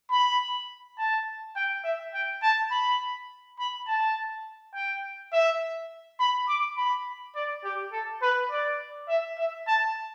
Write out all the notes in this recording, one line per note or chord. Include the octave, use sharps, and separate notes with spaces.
B5
A5
G5
E5
G5
A5
B5
B5
A5
G5
E5
B5
D6
B5
D5
G4
A4
B4
D5
E5
E5
A5